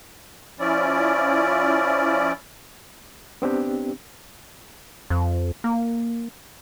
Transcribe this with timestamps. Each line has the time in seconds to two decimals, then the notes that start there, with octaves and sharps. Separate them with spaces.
0.60 F3 C#4 E4 D5
3.42 B3 C4 D4 G4
5.10 F2
5.64 A#3